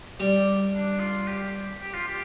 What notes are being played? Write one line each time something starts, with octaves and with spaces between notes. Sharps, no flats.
G3 D5
D4
F4
G4
G4
F4
G4